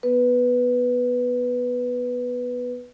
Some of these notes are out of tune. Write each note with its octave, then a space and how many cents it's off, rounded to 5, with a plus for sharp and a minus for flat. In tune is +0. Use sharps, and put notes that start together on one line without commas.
B3 -5 B4 +0